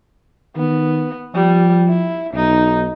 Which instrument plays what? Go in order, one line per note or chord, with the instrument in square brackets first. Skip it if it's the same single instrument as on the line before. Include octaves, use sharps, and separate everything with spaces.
[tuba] D#3 [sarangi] B3
[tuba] F3 [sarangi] G3
[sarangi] E4
[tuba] B1 [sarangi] D#4